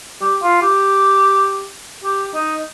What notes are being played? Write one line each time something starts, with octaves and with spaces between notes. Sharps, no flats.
G4
F4
G4
G4
D#4